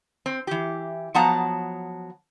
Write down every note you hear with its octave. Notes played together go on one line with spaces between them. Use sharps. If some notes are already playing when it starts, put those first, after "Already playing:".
C4
E3 G4
F3 F#3 B3 F#5 A5 A#5